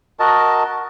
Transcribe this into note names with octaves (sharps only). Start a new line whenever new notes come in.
F#4 A#4 D#5 A5